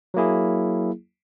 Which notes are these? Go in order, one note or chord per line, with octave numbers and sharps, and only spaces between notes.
F#3 A#3 E4 G#4